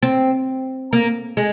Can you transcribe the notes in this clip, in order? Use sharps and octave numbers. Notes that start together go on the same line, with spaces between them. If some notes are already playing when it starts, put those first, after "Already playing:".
C4
A#3
G#3